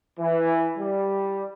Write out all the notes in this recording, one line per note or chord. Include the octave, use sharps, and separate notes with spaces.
E3
G3